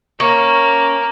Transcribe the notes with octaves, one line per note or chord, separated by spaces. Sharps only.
A#3 C#4